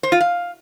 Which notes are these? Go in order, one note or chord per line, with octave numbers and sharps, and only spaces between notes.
C5
F4
F5